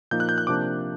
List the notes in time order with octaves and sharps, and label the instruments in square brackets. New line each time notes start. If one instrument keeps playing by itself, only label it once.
[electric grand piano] A#2 F3 A#3 D#4 G6
F#6
G6
F#6
C3 F3 A#3 D4 D6